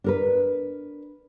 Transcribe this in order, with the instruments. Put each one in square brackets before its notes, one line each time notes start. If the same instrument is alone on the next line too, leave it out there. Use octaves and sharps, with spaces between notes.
[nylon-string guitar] D4 A#4 B4